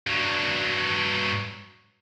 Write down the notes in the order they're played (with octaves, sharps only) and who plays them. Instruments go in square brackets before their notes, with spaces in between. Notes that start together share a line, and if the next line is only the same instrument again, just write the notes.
[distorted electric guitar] G2 F#3